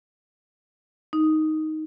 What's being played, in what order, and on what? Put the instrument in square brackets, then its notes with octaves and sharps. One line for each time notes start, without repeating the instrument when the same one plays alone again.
[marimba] D#4